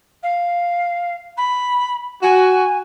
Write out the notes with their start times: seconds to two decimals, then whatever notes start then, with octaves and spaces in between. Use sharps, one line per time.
0.22 F5
1.37 B5
2.22 F#4 G#5